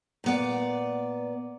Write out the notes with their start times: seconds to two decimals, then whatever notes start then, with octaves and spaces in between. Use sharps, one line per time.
0.24 A#2 B3 D5